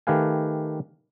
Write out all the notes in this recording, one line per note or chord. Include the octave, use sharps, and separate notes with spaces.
D#3 A3 G4 B4 F5 G#5